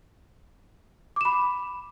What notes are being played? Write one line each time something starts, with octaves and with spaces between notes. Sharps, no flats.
B5 D6 E7